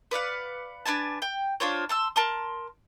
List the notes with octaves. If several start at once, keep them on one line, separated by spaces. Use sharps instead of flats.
B4 D5 F5 F#5
D4 B4 G#5 A5
G5
D4 F4 C5 C#5
A5 C6 E6
A#4 A5 C6